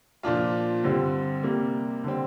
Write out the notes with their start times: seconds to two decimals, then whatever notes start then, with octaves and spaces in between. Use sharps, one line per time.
0.23 A#2 F3 D4 F4
0.84 G2 D3 G3 C4
1.43 C3 G3 A#3
2.04 D3 G3 C4